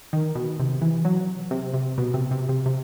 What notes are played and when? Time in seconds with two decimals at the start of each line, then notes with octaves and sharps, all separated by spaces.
0.13 D#3
0.35 B2
0.60 C3
0.81 E3
1.05 F#3
1.51 C3
1.74 C3
1.98 B2
2.14 C3
2.31 C3
2.49 C3
2.66 C3